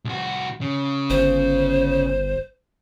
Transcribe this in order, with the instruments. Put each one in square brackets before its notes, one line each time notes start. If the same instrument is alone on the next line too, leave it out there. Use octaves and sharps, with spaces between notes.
[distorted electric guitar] C2 F#4
C#3
[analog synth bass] G1 [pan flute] C5